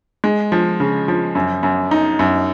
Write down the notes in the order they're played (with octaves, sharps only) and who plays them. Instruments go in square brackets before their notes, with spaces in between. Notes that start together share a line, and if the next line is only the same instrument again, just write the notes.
[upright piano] G#3
F3
C#3
F3
F#2
F#2
D#4
F#2